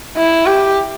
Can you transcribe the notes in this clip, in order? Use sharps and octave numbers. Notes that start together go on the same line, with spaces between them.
E4
G4